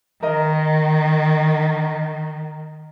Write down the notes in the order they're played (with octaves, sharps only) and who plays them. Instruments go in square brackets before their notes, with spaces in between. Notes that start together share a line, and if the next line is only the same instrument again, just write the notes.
[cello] D#3 [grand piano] A#4 D#5